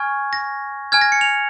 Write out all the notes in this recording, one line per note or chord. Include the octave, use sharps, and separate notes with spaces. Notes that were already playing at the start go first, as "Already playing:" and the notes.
Already playing: G#5 C#6 F6 G#6
A#6
G#5 F6 G#6
A#6
C#7
F7